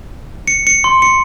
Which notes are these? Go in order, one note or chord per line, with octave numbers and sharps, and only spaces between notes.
C#7
C#7
C6
C#7